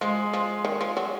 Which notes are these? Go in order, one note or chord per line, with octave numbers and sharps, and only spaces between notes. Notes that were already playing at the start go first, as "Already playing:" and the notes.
F3 G#3
F3
D#3
F3
F#3